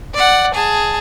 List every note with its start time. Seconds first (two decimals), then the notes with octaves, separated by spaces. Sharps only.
0.14 D5 F#5
0.54 G#4 A5